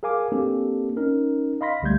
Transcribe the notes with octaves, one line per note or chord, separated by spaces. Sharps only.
G#4 A#4 F5 G#5 D6
A#3 C4 D4 G4 A4
C#4 D#4 A#4
D#5 F5 B5 C6 A#6 B6
C#2 D3 G3 A3 G6 G#6